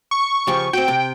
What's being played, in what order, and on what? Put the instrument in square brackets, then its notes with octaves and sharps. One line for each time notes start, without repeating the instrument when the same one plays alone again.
[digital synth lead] C#6
[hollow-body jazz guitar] C#3 F3 G4
[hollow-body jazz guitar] C4 F#4 [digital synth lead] G5
[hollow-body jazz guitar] C3